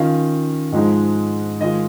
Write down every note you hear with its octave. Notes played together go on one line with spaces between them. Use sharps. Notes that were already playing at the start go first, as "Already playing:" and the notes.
Already playing: D#3 C#4 F4 F5
G#2 F3 G#3 D#4
D#3 G#3 F4 D#5